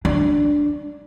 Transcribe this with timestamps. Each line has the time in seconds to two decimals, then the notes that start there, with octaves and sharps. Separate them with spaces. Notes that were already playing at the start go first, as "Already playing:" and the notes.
0.05 D4